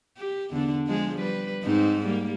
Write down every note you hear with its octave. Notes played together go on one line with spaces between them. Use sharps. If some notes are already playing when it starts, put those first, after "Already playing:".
G4
E2 D3 D4
F3 G#3 G#4
G3 B4
G#2 C4 D#4
G3 A#3